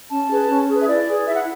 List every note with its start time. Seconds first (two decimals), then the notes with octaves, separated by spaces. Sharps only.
0.10 C#4 A5
0.29 G#4 B4
0.49 C#4
0.68 G#4 B4
0.80 E5
0.87 E4 D5
1.07 G#4 B4
1.26 E4 E5
1.34 F#5